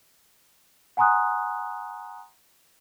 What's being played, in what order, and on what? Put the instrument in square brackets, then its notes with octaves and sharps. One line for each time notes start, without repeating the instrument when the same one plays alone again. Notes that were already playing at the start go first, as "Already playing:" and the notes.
[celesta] F#5 G#5 A#5 C6 D#6 F#6